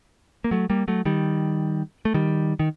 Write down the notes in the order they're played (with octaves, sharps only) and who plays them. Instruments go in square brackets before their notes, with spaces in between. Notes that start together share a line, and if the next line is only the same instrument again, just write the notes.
[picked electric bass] A#3
F#3 A3
G3 A#3
F#3 A3
D#3 G3
A3
D#3 G3
D#3